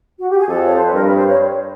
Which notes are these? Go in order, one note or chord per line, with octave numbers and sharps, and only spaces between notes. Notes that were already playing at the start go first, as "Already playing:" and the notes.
F#4
G4
G#4
F2 A4
C#5
C5
B4
G2 A#4
B4
C5
C#5